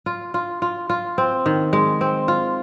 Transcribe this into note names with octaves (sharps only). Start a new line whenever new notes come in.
F4
F4
F4
F4
C4
D#3
G#3
C4
F4